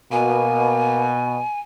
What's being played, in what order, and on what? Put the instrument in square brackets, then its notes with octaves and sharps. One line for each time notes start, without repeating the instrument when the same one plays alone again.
[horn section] B2 [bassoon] A#3 [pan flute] G#5